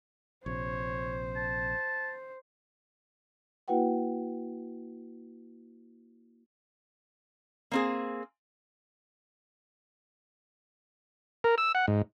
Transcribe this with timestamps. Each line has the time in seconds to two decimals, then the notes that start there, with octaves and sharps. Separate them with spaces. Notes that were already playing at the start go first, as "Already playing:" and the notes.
0.46 A#1 C3 C5 C#5
1.36 A5
3.68 A#3 E4 F#4 B4 F#5 G5
7.71 A#3 C4 G#4
11.44 A#4
11.58 E6
11.75 F#5
11.88 G#2